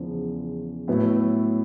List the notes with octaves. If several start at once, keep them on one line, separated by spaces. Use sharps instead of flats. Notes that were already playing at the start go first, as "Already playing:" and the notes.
Already playing: E2 C#3 F3 G#3
A2 F#3 B3 E4